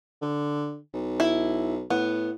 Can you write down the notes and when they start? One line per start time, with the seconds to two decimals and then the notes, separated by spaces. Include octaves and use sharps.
0.22 D3
0.94 B1
1.20 E4
1.90 A2 B3